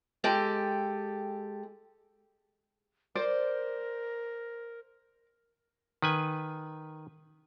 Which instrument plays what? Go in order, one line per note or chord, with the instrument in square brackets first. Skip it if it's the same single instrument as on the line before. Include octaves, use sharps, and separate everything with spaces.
[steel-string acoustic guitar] G#3 G4 A4 G5
[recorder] A#4 [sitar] C5 [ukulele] D5
[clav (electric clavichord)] D#3 B4 G#5